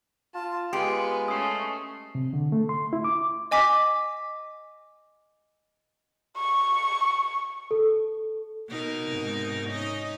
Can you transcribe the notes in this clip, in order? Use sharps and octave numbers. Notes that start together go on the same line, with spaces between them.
F4 A5
G#3 B3 F4 G4 G#4
A3 C#4 D#6 C7
C3
D3
A3
C6
E4
D6
D#5 G#5 D6 B6
C#6
A4
B2 D#4 A#4
G#2 C3
C#4 D#4 D#5